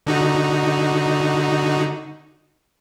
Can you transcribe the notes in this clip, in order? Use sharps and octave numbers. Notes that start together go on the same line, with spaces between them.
D3 D#4 F#4